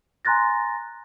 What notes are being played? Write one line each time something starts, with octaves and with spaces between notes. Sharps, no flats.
G#5 A#5 C6 F#6 A6 A#6